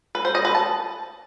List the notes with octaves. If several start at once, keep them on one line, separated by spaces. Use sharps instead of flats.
B4
C5
D#5
B4
A5